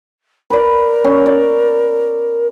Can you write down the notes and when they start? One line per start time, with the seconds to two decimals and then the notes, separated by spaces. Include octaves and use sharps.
0.50 A#4 B4 D5
1.04 C#4
1.26 D5